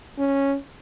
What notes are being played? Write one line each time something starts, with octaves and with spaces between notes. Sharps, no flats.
C#4